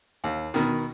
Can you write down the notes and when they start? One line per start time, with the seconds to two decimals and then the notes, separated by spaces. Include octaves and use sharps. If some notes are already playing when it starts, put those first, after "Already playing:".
0.24 D#2
0.54 B2 D#3